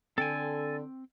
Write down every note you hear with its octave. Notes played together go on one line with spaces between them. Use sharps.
D3 C4 A4 G5 G#5